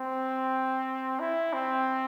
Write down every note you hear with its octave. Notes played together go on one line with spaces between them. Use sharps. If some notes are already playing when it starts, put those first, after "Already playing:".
Already playing: C4
E4
C4